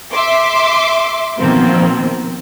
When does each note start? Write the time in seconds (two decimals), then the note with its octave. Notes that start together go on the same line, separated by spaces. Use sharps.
0.12 E5 C6 D6
1.40 B2 D#3 F3 A#3 C4